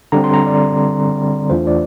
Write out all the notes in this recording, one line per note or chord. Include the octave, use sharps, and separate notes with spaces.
D3 G3 C4 A#5
C6
A#5
D5
E2 E3 A3 D4 F4 C5
D5